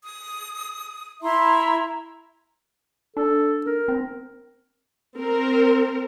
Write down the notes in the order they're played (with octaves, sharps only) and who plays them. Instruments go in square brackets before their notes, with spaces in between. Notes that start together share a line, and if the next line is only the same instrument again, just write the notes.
[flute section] D#6
E4 E5 A#5 C6
[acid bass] D4 [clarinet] A4
[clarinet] A#4
[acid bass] C4
[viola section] C4 A#4